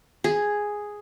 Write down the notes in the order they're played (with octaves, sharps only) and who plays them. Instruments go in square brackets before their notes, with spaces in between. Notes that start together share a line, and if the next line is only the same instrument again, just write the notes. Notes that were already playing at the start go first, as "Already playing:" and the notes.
[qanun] G#4